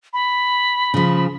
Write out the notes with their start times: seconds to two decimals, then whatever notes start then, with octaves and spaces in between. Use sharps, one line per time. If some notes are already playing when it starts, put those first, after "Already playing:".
0.13 B5
0.94 C#3 F3